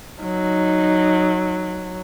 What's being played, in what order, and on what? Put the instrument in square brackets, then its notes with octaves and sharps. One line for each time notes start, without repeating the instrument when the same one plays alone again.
[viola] F#3 [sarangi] D#4